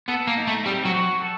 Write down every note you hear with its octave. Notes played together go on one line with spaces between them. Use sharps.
B3 A4
A#3
D#4
A3
G3 C4
F#3
F#4
A4